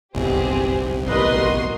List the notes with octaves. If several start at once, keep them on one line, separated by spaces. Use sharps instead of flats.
F#1 C2 G2 B2 C4 G4 G#4
A1 B2 G3 A#4 B4 D#5 C6 D#6
F#4